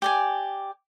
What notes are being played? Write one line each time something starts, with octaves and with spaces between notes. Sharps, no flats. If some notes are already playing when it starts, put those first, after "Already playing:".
G4 D5 G#5